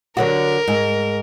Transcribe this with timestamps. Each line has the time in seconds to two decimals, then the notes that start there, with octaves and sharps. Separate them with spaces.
0.17 D3 F#3 F#4 A#4
0.68 G#2